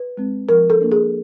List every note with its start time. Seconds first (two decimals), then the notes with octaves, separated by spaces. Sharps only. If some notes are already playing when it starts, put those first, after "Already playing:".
Already playing: B4
0.17 G#3 C4
0.49 F3 A#4
0.70 A4
0.81 A#3 D4
0.92 G#4